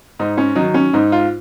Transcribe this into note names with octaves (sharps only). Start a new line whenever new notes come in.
G#2 D#4
C#4
D#3 F#3 D#4
C#4
G#2 D#4
F4